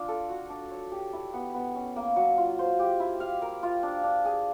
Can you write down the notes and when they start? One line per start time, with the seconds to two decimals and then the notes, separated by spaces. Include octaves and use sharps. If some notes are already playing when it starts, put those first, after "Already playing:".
Already playing: D4 F4 D5
0.08 A4
0.30 F#4
0.50 D4
0.71 C#5
0.92 G4
1.13 E4
1.33 B3
1.54 B3
1.76 C#4
1.96 A#3
2.16 F#3
2.38 F4
2.59 C5
2.79 G4
3.00 E4
3.20 F5
3.42 A#4
3.63 F4
3.83 D4
4.04 D4
4.25 G#4